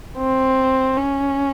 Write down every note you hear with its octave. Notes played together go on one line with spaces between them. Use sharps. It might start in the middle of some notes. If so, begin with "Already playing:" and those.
C4
C#4